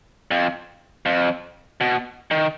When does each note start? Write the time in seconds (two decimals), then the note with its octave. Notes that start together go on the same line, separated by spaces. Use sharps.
0.31 F2
1.06 F2
1.81 B2
2.31 D#3